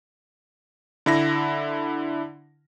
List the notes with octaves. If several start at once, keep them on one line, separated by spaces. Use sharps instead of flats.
D3 E4 A#6